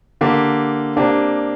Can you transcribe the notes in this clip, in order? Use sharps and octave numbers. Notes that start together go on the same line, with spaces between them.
D3 A#3 G4
C3 A#3 D4